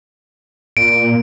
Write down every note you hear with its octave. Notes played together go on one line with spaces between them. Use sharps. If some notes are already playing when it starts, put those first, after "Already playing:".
A#2 D7